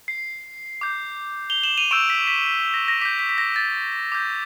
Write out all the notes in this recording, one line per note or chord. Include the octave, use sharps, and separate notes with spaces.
C7
D6 G6
F7 G7
E7 F#7
D#7 F7
C#6 E6 G6 D7 E7
B6
B6
B6
A#6
A#6
D6 G6 B6
B6
B6
A#6
A6
D6 G6